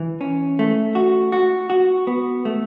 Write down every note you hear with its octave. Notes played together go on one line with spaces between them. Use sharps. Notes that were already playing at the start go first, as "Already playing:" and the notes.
Already playing: E3
C#4
A3
F#4
F#4
F#4
B3
A3